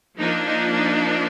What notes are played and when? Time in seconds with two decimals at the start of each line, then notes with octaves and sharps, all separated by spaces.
0.18 F3 A#3 D4 D#4
0.46 D#4
0.74 D#4